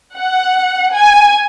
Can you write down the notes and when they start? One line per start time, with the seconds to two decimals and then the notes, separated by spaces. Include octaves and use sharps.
0.15 F#5
0.94 G#5